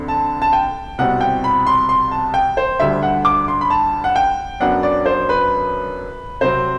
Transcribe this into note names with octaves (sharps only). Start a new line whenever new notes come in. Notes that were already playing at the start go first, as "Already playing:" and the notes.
Already playing: D2 D3 C4
A5
A5
G5
C2 B2 G3 C4 F#5
G5
B5
C6
C6
A5
G5
C5
D2 D3 G3 E5
F#5
D6
C6
B5
A5
F#5
G5
F#2 F#3 B3 D4 F#5
D5
C5
B4
C3 F#3 C4 C5